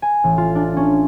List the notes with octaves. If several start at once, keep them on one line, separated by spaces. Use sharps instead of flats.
G#5
A1
F4
D4
C#4